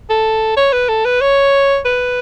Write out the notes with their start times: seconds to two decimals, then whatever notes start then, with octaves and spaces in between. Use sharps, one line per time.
0.10 A4
0.57 C#5
0.73 B4
0.89 A4
1.05 B4
1.21 C#5
1.85 B4